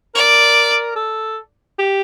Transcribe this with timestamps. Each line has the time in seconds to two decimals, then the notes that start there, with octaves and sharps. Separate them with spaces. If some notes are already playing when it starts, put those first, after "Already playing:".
0.15 A#4 D5
0.96 A4
1.79 G4